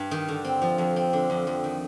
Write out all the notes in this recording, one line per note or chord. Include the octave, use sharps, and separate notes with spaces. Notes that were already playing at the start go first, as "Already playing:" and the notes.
Already playing: G2
D#3
D3
C4
F3
F2
C4
D3
F2
F2
D#3